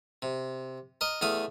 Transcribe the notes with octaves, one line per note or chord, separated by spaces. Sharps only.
C3
A#4 D#5
E2 A3 F5 D#6